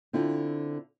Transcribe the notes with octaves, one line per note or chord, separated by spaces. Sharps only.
D3 C4 E4 F4